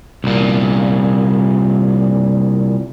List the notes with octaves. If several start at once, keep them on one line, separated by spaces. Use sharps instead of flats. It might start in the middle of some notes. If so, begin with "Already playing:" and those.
C2 A#2